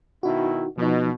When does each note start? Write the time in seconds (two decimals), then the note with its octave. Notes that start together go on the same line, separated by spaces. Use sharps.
0.23 B2 D#3 D#4 E4 F#4
0.78 B2 F3 D#4